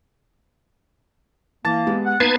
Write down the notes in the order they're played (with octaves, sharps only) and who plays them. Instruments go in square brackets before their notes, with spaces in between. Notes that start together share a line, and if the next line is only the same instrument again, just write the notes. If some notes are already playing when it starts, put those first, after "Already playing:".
[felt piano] E3 [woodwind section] A#3 [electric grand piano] A5 A6
[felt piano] G#3 B3 G4
[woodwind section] F#5
[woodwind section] A#3 D#4 [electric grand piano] B3 [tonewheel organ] B4 A5 G#6 [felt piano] C7